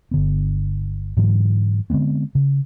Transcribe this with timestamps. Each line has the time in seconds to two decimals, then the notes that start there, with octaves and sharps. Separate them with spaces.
0.11 G1 D3 B3
1.17 G#2 D3 E3 F#3
1.90 D3 G#3 B3 C4
2.35 C#3